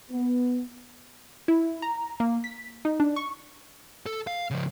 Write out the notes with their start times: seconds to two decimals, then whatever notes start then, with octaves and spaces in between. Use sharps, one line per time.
0.11 B3
1.48 E4
1.82 A#5
2.20 A#3
2.44 B6
2.85 D#4
3.00 D4
3.16 C#6
4.06 A4
4.27 F5
4.51 C#3 F3